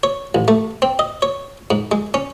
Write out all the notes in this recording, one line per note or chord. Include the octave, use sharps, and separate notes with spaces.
C#5
A1
A3
C4
D#5
C#5
G#2
G#3
C#4